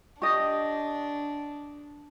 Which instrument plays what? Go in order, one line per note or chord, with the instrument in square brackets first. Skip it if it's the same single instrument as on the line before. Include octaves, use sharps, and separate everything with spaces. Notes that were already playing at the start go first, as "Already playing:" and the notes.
[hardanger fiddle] D4 [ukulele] G4 D#5 [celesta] C#6 D#6 A#6